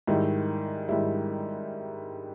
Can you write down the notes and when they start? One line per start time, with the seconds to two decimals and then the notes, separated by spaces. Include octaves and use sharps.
0.07 G#2 D#3 G3 E4
0.88 G#2 D#3 G3 E4